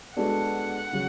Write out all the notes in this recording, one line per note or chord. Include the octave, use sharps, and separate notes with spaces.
G#3 B3 D4 F#4 A4 F#5
C#3 F#3